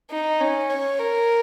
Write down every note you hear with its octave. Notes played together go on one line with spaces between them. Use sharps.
D#4
C#4
C#5
A#4